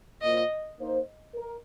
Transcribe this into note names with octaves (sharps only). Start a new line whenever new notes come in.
A#2 A#3 F4 C5 D#5
A#3 D#4 C5
A#4